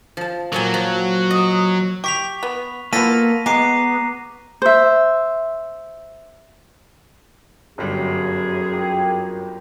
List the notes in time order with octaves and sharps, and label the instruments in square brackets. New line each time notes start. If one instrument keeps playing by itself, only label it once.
[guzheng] F3 A5
[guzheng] A#2 F3 G#5 [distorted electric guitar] F#3
[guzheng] F3 F#4
D#5
[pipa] G4 [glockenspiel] C#6 B6 F7
[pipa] B3
[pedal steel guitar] A#3 [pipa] B3 F4 A4 [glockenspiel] A#6 B6 D#7
[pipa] G#3 [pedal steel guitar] B3 [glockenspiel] A#5 D6 C7
[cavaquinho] C5 E5
[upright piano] G1 G3 [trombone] F#2 [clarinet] G#4
[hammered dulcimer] F4 G4 A#4